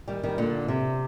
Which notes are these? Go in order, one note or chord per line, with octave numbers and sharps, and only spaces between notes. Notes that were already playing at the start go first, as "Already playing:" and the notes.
D#3 G3
D#3 G3
A#2 D3
C3